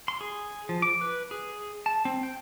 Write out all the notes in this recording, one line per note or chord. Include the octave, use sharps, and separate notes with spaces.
C6
G#4
F3
D6
B4
G#4
A5
C4
G5